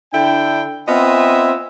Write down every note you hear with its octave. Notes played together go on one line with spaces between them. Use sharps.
D3 D4 E4 G5
B3 C4 F4 D#5 E5 G#5